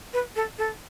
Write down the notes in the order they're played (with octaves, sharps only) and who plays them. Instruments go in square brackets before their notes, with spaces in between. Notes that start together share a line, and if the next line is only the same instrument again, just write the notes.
[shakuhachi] B4
A4
A4